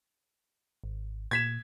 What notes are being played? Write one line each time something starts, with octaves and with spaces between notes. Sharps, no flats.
G#1
A#2 G#6 B6 E7